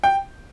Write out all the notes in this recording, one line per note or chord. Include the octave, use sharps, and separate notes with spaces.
G5